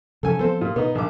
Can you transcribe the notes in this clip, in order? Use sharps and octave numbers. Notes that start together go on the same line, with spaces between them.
C3 F3 C#4 A4 G#5
F3 B3 C4 A4 C5
A#2
B2 B3 D#4
A#1 D6